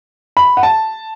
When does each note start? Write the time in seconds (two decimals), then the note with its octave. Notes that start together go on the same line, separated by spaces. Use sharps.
0.37 B5
0.57 F#5
0.63 A5